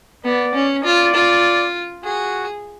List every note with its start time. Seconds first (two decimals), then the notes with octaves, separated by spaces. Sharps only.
0.24 B3 D5
0.55 C#4
0.84 F4 D5
1.14 F4
2.04 F#4 G#4